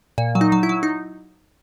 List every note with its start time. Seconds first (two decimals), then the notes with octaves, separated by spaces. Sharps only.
0.18 A#2
0.35 F#3
0.41 D#4
0.52 F#3
0.63 E4
0.69 F#3
0.83 D#4